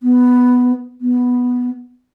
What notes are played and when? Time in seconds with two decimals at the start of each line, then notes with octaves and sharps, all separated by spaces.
0.03 B3
1.01 B3